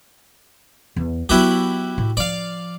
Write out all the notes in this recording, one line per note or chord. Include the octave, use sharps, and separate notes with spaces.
E2
F#3 B3 E4 F#4 G4
A2
F3 D5 F5